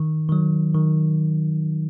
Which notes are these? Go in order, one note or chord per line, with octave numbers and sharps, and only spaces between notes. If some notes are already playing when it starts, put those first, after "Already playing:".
Already playing: D#3
D#3
F#3
D#3